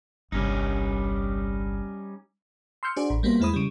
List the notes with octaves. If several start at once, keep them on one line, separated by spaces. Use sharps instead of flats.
G1 C2 G3 C#4 D#4
C6 E6 F6 G6 C#7
D4 F#4 G#4 C5 D5
A1
G3 A#3 B3 F#4 C5
E2 G#3 E4 C5 B5 D#6
C#3 G3